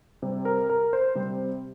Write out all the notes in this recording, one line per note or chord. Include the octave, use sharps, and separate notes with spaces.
C3 G3 C4
A#4
A#4
C5
C3 G3 C4